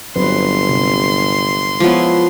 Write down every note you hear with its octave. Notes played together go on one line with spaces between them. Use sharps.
G1 F#3 C4 B4 C6
C3
F3 G#3 B3 E4 C#5